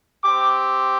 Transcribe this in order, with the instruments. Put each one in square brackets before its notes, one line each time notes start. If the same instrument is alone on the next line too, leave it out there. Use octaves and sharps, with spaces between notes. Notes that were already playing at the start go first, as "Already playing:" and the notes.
[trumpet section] C4 G4 D6